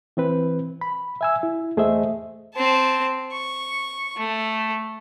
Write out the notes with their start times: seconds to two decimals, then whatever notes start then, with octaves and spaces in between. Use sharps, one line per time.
0.17 E3 C4 B4
0.81 B5
1.21 E5 G#5 E6
1.43 E4
1.77 E2 A3 G#4 C5 D#5 E5
2.55 C4 A5
3.33 C#6
4.17 A3